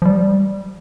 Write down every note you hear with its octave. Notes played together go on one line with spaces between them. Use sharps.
F3
G3